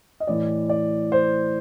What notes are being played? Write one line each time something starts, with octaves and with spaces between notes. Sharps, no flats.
D#5
A2 E3 D5
D5
C5